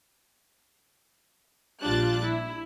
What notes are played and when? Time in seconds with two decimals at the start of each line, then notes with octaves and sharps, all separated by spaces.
1.84 A#1 G3 D4 F4 F#6 A6
2.24 E4